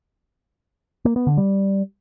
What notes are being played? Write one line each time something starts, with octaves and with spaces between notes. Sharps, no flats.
A#3
B3
D3
G3